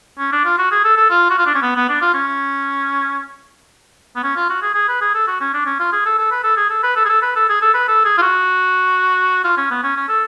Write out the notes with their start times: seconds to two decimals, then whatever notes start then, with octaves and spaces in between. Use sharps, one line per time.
0.18 C#4
0.32 D4
0.45 F4
0.58 F#4
0.72 G#4
0.84 A4
0.97 A4
1.10 F4
1.30 F#4
1.39 F4
1.46 D4
1.55 C#4
1.62 B3
1.76 B3
1.89 D4
2.02 F4
2.14 C#4
4.16 B3
4.23 C#4
4.36 F4
4.49 F#4
4.62 G#4
4.75 G#4
4.89 B4
5.01 G#4
5.14 A4
5.27 F#4
5.41 C#4
5.54 D4
5.66 C#4
5.80 F4
5.92 G#4
6.06 A4
6.19 A4
6.31 B4
6.44 A4
6.57 G#4
6.70 A4
6.83 B4
6.96 A4
7.05 G#4
7.09 A4
7.22 B4
7.36 A4
7.49 G#4
7.62 A4
7.74 B4
7.88 A4
8.05 G#4
8.18 F4
8.22 F#4
9.44 F4
9.57 C#4
9.71 B3
9.83 C#4
9.96 C#4
10.09 A4